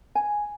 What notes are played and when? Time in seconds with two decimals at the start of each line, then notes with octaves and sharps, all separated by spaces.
0.15 G#5